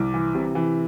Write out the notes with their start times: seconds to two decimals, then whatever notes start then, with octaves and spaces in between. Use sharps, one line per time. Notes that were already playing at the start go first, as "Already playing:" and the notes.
Already playing: C2 D6
0.14 E3
0.35 C3
0.55 E3